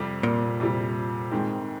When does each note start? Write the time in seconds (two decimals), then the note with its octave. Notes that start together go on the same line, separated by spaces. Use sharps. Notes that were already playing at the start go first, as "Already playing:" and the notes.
Already playing: F2 C3 G3
0.23 A#2
0.60 F2 C3 G3
1.31 G#2 D#3 G#3 C4